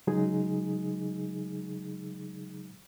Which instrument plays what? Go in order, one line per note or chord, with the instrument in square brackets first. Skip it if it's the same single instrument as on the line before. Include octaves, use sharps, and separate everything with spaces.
[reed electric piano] C#3 F#3 G#3 D#4 G#4